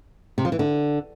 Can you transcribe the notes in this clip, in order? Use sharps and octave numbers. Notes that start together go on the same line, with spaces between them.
C3
F3
E3
D3